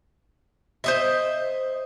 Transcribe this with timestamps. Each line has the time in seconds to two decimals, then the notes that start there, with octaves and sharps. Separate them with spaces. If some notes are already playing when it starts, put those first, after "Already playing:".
0.84 C5 D#5 E5